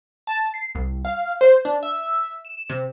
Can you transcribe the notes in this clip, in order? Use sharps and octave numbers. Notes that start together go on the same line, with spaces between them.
A5
C7
C2
F5
C5
D4
E5
E7
C3